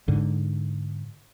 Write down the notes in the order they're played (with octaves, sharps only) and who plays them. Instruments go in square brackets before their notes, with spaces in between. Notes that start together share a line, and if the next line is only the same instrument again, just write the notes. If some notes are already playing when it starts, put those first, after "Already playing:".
[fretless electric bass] G#2 D3